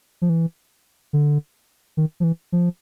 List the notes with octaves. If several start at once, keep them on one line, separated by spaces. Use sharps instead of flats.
F3
E3
D3
D#3
F3
E3
F3